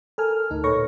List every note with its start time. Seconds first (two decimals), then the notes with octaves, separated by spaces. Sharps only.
0.18 A4 A#4 G#5 F6
0.50 D2 A2 D#4
0.64 A#2 A4 B4 C#5 C#6 A#6